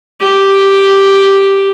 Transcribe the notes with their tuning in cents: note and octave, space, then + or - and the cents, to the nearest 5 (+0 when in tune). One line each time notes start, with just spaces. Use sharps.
G4 +0